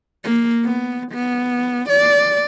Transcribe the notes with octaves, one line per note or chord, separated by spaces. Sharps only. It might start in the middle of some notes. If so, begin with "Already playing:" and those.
A#3
B3
B3
D5